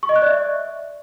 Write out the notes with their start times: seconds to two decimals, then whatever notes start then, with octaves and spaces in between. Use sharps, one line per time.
0.03 C#6
0.09 D#5
0.16 F#6
0.22 D5
0.28 E5